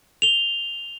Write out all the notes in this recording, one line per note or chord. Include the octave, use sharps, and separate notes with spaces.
F7 G7